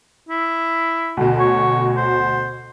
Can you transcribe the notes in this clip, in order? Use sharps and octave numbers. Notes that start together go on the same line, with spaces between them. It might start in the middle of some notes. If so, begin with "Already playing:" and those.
E4
D2 B2
C#5
C5